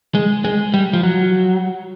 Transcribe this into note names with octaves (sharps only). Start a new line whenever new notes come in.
G#3
G#3
G3
F3
F#3